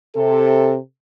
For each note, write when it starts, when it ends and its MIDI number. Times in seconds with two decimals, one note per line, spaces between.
0.16 0.76 48
0.16 0.76 69